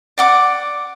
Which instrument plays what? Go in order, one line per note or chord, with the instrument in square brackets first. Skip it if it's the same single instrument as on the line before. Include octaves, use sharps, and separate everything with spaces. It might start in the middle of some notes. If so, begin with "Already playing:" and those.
[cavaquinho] D5 F#5 D6